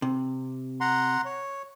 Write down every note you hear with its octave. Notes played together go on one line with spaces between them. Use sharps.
C3
F#5 A#5 C6
C#5